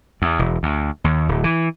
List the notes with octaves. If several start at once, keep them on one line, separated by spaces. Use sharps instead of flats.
E2
E1
D2
D#2
D1
E3